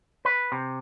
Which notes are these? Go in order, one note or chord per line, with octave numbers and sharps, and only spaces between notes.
B4
C3